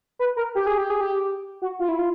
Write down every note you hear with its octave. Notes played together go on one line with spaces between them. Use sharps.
B4
A#4
G4
G#4
G4
G#4
G4
F#4
F4
E4
F4